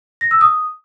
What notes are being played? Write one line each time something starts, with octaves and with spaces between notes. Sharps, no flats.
A#6
E6
D#6